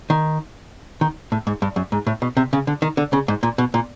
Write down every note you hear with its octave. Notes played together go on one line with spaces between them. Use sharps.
D#3
D#3
A2
G#2
G2
F#2
G#2
A2
B2
C3
C#3
D3
D#3
D3
C#3
G#2
A#2
B2
A#2